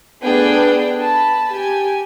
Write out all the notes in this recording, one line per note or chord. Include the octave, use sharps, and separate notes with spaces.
A3 B3 D4 G#4 G5
A5 B5
G4 G#5